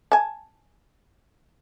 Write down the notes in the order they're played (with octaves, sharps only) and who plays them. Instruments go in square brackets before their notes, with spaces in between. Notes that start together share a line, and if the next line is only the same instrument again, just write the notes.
[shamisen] G#5 A5